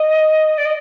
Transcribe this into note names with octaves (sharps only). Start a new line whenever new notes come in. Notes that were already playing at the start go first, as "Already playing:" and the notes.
Already playing: D#5
D5
D#5